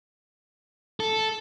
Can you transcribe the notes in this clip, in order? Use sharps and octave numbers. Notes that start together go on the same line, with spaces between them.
A4